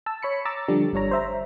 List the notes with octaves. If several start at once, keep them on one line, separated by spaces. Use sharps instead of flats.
A5 E6
C#5 B5 C#7
A#5 D6 E6 A6
D3 F3 G3 D4
G1 G2 D4 C#5 A#5
C5 E5 A#5